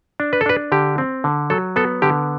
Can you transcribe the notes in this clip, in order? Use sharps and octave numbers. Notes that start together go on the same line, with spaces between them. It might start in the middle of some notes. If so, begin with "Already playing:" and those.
D4
B4
A4
D4 B4
D3 G4
C4
D3
F#3 A4
B3 A4
D3 G4